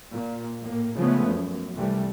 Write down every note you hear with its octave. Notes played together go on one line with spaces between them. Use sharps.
A#2
A2 A#3
C#3 F3 G#3 A3 B3 C#4
F#2
C2 C3 E3 G3 A3